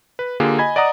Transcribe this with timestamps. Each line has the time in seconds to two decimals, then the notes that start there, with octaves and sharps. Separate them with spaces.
0.19 B4
0.40 D3 A#3 F4 G4 G#4
0.59 D#5 G#5 B5 G#6
0.76 D5 D#5 F#5 A#5 D#6